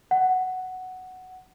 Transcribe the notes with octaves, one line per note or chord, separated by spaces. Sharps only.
F#5